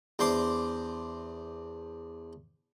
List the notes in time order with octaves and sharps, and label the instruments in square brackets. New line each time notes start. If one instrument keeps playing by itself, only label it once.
[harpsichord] E2 D4 C5 C6 D6